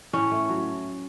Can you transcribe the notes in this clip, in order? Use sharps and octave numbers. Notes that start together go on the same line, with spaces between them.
A2 C#4
A3
F#3